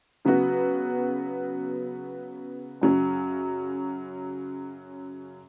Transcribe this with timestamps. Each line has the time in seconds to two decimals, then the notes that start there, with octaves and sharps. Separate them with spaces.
0.25 C#3 F#3 B3 F#4
2.82 F#2 C#3 F#3 C#4